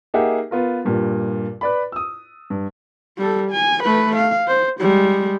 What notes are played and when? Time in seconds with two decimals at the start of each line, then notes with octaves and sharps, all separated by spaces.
0.14 A#3 D#4 G4 G#4 E5 F#5
0.51 B3 F4 A#4
0.85 G2 A#2 G3
1.61 B4 D5 B5
1.92 D#6 E6
2.50 G2
3.18 G3 A4
3.51 G#5
3.84 A3 B4
4.16 F5
4.48 C5
4.80 G3 G#3